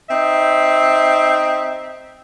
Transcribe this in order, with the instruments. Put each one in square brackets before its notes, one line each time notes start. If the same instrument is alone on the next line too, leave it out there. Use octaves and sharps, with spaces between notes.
[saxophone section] C4 D#4 E5